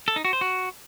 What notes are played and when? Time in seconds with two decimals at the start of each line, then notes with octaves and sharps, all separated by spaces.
0.08 A4
0.16 D#4
0.25 F#4
0.33 C5
0.41 F#4